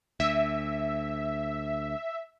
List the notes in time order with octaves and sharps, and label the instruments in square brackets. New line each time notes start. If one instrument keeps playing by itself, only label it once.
[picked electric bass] D2 [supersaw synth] E5